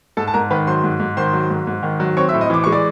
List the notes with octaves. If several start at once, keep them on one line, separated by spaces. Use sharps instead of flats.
G#2 A4 A5
A5
G#2 A#4 A#5
D#3 B4 B5
F#3 C5 C6
G#2
G#2
D#3 C5 C6
F#3
G#2
G#2
D#3
F#3
C4 C#5 C#6
E5 E6
A2
D#5 D#6
E3 D6
G#3 C#6
D5 D6